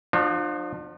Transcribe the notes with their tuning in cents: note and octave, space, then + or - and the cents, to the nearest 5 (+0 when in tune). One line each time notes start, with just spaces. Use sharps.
F3 +20 D4 +45 F#4 -10